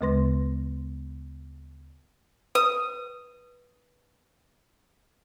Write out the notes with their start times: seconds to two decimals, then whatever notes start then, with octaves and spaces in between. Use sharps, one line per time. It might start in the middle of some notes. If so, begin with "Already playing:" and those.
0.01 D2 C#3 G#3 B4 C6 A#6
2.55 B4 D#6